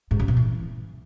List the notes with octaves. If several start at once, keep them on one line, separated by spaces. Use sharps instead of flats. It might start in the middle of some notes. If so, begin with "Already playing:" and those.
G#2
C#3
B2
E3